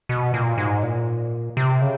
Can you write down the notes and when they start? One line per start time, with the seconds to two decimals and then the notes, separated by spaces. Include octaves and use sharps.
0.09 B2
0.34 A#2
0.58 G#2
0.83 A#2
1.57 C3
1.82 C#3